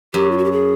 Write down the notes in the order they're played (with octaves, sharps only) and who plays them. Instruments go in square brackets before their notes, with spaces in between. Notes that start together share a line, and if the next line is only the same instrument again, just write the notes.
[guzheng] F#2 [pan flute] G4
[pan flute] F4
F#4
G4
G#4